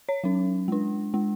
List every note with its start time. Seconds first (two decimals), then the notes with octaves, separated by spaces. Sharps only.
0.09 C#5
0.24 F#3 C#4
0.68 G#3 D4
1.14 G#3 D4